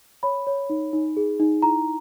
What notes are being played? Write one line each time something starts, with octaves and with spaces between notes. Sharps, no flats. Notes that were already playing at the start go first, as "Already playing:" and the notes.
C#5 B5
C#5
D#4
D#4
G#4
D#4
E4 A#5